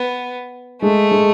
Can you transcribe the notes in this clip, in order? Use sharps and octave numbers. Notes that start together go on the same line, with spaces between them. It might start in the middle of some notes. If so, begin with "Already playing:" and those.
Already playing: B3
G#3 A3
G#3